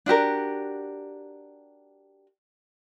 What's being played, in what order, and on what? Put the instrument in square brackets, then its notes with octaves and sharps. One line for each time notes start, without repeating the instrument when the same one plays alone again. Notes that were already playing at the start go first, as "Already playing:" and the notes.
[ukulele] D4 F#4 G4 A#4